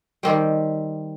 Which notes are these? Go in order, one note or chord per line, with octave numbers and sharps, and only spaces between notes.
D#3 G3 C4 G4 C5